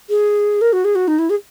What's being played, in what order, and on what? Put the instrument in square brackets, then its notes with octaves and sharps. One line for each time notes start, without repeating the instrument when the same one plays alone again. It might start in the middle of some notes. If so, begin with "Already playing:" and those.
[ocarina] G#4
A#4
F#4
G#4
F#4
D#4
E4
G#4